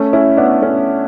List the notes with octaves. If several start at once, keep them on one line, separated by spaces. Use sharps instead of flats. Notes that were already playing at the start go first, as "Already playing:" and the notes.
Already playing: A3 C#4
C#4 E4
B3 D4
A3 C#4